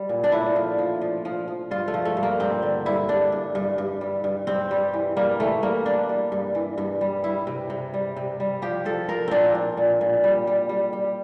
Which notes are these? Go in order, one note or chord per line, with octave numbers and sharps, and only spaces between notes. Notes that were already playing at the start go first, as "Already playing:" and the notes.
Already playing: G3
A#2
D4
A2 E4
F3
F3
F3
F3
F3
G2 F4
A3
F3
A3
G2
A#3
G2 C4
D3
G2 E4
G2 D4
G2
G2
G2
G3
G2
G2 C4
G3
E3
G3 A#3
E3 A3
G3 A#3
G3 D4
G3
G2
E3
G2
G3
G3 E4
C3
C3
G3
C3
G3
F3 G4
F3 A4
F3 A#4
A#2 C4 D4
A#2
A#2
A#2
G3
G3
G3
G3